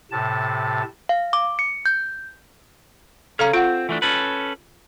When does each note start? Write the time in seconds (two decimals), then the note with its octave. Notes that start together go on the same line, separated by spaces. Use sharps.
0.11 A2 C3 A5
1.09 F5
1.33 D6
1.59 C#7
1.86 G6
3.39 C#3 C#4 A4 F5 A#5
3.53 C4 F4 F#5
3.89 E3 A3 D4
4.02 C#4 A4 B4